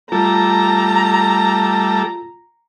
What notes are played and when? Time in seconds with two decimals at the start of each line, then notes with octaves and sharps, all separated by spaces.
0.12 G3 A3 F4 A4 A#5